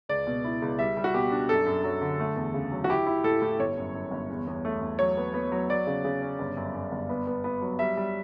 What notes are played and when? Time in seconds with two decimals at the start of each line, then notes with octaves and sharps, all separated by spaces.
0.09 C#2 D5
0.27 B2
0.44 E4
0.62 C#2
0.79 G3 E5
0.97 G3
1.04 F#4
1.14 B2 G4
1.31 D4
1.49 F#2 A4
1.66 F#2
1.84 F#3
2.01 D3
2.20 A3
2.36 E2
2.54 C#3
2.71 F#3
2.84 F#4
2.89 E4 G4
3.06 E4
3.24 A2 A4
3.42 A2
3.59 G1 C#5
3.77 F#2
3.94 F#2
4.11 G1
4.30 E2
4.47 E2
4.65 A3
4.81 E2
4.99 F#3 C#5
5.17 B3
5.34 B3
5.52 F#3
5.69 F#3 D5
5.87 C#3
6.04 C#3
6.22 C#4
6.39 G1
6.57 F#2
6.74 F#2
6.92 G1
7.09 B3
7.27 B3
7.44 B3
7.62 F#3
7.79 G3 E5
7.97 G3